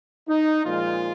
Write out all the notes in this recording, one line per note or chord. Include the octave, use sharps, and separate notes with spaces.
D#4
A#2 F3 G#3 F4